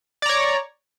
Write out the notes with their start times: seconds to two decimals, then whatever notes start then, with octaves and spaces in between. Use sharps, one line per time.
0.22 D5
0.26 A#5
0.29 C#5